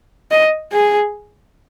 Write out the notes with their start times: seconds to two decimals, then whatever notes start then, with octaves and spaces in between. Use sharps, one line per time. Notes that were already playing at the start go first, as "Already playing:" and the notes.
0.31 D#5
0.72 G#4